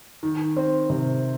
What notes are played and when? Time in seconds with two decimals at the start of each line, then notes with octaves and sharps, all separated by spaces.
0.23 D#3
0.57 C4
0.90 C3